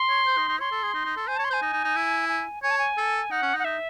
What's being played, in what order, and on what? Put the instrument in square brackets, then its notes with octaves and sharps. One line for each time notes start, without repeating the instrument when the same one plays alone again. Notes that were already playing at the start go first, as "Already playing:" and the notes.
Already playing: [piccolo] C6
[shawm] C#5
C5
D#4
D#4
[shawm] C#5 [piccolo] C6
[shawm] A4
G#4
D#4
D#4
A4
[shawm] C5 [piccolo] G#5
[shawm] C#5 [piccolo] A5
[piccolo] C6
[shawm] C5
[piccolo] G#5
[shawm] D#4
D#4
D#4
E4
[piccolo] G#5
[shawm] C#5 [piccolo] G#5
[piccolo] A5
G#5
[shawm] A4
[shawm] D#4 [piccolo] F#5
[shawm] C#4
D#4
[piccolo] F#5
[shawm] D#4 [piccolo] E5